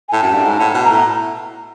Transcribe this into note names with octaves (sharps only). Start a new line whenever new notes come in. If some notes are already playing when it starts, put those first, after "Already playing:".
G#5
A2 A5
F#2
G2
G#2
A2
B2 A5
A#5
A2